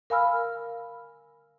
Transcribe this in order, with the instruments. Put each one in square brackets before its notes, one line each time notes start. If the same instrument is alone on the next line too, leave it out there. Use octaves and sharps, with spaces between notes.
[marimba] A#4 F5 G#5 B5 E6 F6